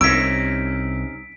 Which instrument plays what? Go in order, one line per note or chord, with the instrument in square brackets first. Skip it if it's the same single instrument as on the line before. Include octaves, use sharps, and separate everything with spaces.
[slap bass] C2 C3 [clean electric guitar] C4 C#4 D#4 [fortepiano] E6 [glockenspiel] B6 D7